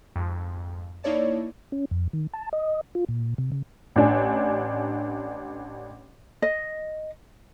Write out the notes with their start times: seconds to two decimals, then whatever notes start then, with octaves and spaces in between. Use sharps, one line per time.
0.16 F2 G#2
1.03 A#3 D#4 E4 C#5 D5 A5
1.72 C#4
1.91 F2
2.13 D#3
2.33 A5
2.53 D#5
2.95 F4
3.09 A#2
3.38 C3
3.52 C#3
3.96 A1 D4 G#5
6.42 D#5